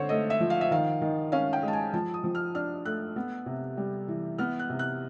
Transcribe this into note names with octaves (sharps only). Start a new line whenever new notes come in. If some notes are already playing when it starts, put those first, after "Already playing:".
Already playing: D3 C4 C5 C#5
A3 D#5
E5
F3
F5
E5
D#3 F5
D#3
C#4 F5
G5
G#3
A5
G#5
F3 A5
D#6
F3
F6
D4 F6
A3 F#6
B3
C3
G3
E3
B3 F6
F#6
C3
F#6